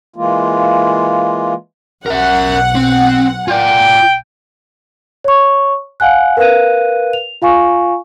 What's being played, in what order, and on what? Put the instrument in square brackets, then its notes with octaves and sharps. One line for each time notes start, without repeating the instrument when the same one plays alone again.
[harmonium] E3 G#3 A#3 F4
[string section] B1 F#5 [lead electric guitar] A#4 E5
[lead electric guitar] C4
[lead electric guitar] F4 D5 [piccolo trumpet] G5
[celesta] C#5 C#6
F5 F#5 G#5 F#6
A#4 B4 F5 F#6 D#7
F7
F4 F5 G#5 C#6